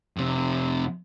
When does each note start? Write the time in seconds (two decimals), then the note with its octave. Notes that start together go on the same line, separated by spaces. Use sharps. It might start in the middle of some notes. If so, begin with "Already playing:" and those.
0.17 F2 C3